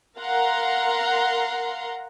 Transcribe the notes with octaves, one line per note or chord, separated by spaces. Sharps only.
A#4 F5 F#5 A#5 C6